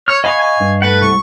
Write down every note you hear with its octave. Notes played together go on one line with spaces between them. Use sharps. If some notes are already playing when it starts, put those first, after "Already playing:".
C#5 F6
D#5 F5 F#5 G#5 B5 C#6
G#5
G2
A3 B4 F#5
C2 C#6